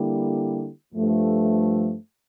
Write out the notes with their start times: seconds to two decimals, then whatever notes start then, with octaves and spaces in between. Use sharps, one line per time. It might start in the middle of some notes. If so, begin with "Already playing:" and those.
Already playing: D3 G3 A#3 E4 G4
0.94 G2 F3 A3